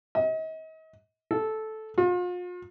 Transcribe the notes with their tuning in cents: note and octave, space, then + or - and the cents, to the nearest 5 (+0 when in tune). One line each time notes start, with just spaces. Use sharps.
D#5 +40
A4 -10
F4 +40